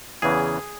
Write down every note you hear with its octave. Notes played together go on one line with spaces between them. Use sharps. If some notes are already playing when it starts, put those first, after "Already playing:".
E2 C#3 E3 G#4